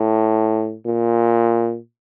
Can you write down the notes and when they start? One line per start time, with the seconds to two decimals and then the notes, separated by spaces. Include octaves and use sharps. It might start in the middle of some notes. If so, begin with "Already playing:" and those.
Already playing: A2
0.86 A#2